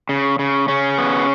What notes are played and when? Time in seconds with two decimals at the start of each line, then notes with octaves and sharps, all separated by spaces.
0.09 C#3
0.39 C#3
0.68 C#3 C#4
0.98 B3